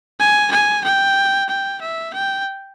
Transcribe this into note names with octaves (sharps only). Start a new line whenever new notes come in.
G#5
G#5
G5
G5
E5
G5